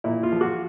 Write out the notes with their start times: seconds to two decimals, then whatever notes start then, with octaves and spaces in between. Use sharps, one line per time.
0.04 A#2 E4
0.23 F4
0.32 F3
0.41 F#4